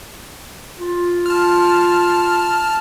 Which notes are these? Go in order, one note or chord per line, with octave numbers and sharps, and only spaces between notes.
F4
A5 F6